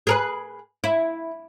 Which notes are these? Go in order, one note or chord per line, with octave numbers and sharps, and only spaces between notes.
G#4 A#4 B4
E4